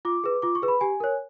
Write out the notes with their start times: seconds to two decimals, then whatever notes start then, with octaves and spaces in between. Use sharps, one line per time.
0.05 F4 D6
0.24 G#4 B4
0.42 F4 D6
0.55 C#6
0.62 G#4 B4
0.68 B5
0.81 G4 G#5
1.00 A#4 C#5